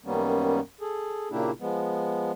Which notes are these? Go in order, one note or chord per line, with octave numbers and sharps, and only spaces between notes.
F#2 D#3 G3 A#3 B3 C#4
G#4 A4
A#2 C#3 A#3 D4 E4 G4
F3 G#3 B3